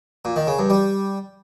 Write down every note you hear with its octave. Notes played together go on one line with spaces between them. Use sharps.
A#2
D#3
C#3
G2
G3